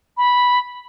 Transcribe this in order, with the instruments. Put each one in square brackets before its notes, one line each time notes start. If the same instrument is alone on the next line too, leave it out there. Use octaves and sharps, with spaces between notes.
[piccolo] B5